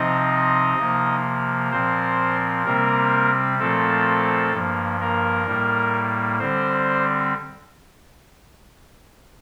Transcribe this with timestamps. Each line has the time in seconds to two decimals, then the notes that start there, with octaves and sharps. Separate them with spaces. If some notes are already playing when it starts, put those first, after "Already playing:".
Already playing: C3 F3 C4 D#4 D#5
0.78 C3 F3 A#3
1.72 A#2 F3 C4 C5
2.65 C3 G3 A#3 C4 A#4
3.59 A#2 F3 A3 C4 A4
4.52 G2 F3 A#3
5.00 A#3 A#4
5.46 A2 G3 A#3
6.39 D3 G3 C4 C5